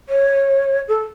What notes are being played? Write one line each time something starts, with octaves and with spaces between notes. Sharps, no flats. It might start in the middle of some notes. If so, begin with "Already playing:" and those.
C#5
A4